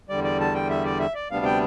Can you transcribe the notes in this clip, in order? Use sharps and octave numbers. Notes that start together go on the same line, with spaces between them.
E2 D3 G3 D5
D5
A5
G5
E5
D5
E5
D5
D2 C3 G3 B3 D4 F5
G5